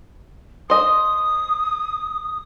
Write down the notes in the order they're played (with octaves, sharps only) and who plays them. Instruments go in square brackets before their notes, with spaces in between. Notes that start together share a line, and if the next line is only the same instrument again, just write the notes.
[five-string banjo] C5 D#5 [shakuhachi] D#6